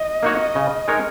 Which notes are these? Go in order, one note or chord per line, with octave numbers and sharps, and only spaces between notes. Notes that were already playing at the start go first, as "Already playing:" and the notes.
Already playing: D#5
A#3 D#4 F#4 C#5
C#3
G#3 D#4 A#4 C#5